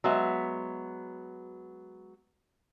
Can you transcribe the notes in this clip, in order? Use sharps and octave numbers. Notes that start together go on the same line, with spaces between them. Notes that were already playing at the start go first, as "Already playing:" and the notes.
F#3 G#3 B3 E5